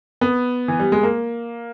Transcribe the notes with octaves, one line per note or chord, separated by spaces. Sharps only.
B3
E3
G3
G#3
A#3